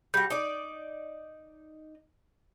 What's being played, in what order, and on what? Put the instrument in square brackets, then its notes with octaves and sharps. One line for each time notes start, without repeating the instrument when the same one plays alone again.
[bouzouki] G3 F#4 [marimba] G6
[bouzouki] D#4 D5